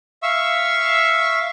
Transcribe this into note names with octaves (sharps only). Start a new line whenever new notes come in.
E5 F5 C#6 E6